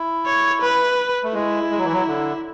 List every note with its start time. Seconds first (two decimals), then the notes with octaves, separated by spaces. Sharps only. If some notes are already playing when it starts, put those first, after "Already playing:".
Already playing: E4
0.26 C#5
0.61 B4
1.23 A3
1.34 G#3 E4
1.71 G#3
1.78 F#3
1.85 E3
1.93 F#3
2.08 D3